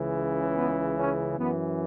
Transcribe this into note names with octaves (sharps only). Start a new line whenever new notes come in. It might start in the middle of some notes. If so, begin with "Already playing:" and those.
Already playing: C#2 C#3 E3
B3
C#4
F#2 E3 B3